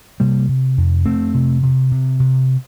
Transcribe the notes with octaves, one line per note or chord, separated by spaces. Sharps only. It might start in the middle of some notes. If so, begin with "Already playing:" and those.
C3 G3 A#3
C3
F2
F2 A3 C4
C3
C3
C3
C3